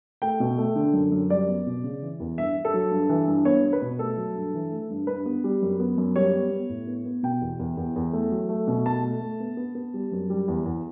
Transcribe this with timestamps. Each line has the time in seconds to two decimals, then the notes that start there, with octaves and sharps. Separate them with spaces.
0.22 A3 G5
0.40 B2
0.58 A3
0.76 D3
0.93 F#2
1.12 F#2
1.30 G3 D5
1.48 B3
1.66 B2
1.84 C#3
2.02 E3
2.20 E2
2.38 G2 E5
2.56 G2
2.65 A4
2.74 F#3
2.91 G2
3.09 E3
3.27 G2
3.45 B3 C#5
3.64 B3
3.73 B4
3.82 B2
3.99 A3 A4
4.17 F#3
4.35 G2
4.54 E3
4.71 A3
4.90 G2
5.07 G2 B4
5.26 B3
5.44 G3
5.62 F#2
5.80 B3
5.98 F#2
6.16 G3 C#5
6.33 B3
6.51 B3
6.69 A2
6.87 B3
7.05 B3
7.23 B2 G5
7.41 E2
7.59 E2
7.77 E2
7.96 E2
8.13 A3
8.31 F#3
8.49 A3
8.68 B2
8.85 A3 A5
9.03 A3
9.21 A3
9.40 B3
9.57 B3
9.75 B3
9.94 G3
10.12 F#2
10.30 G3
10.48 E2
10.66 E2